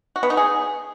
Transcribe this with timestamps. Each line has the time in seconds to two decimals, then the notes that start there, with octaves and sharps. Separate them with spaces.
0.16 F#4
0.23 B3
0.30 D#4
0.37 G#4